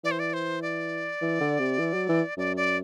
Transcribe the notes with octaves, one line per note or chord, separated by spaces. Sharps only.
E3 D5
C5
D5
C5
D5
E3
D3
C3
E3
F#3
E3
F#2 D5
D5